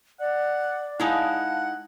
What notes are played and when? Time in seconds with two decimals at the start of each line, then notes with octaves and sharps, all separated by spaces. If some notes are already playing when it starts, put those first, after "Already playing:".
0.20 D5 F#5
1.00 G#3 D#4 E4 F5 F#5 A5